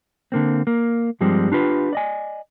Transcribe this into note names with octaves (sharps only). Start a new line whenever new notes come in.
D3 A#3 C4
A#3
G2 F3 G3 G#3 C4
D4 F4 G4 B4
D5 D#5 G#5